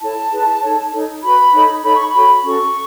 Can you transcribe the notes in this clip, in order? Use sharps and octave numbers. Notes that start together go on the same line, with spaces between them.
E4 A4 C#5 A5
E4 G#4 B4
D#4 A4 C#5
D#4 A4 C#5
F#4 B4 B5
D#4 A4 C#5
D#4 A4 C#5 B5
C#6
B5
F#4 A4 C#5
C#4 F#4 A4 C#6